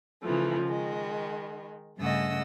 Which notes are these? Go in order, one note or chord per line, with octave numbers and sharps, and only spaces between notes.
C#3 E3 F3 A3
D#3 G#3
G2 C#3 A3 D#5 F#5 E6